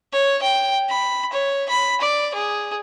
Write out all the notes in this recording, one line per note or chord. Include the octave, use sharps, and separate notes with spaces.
C#5
G5
B5
C#5
B5
D5
G#4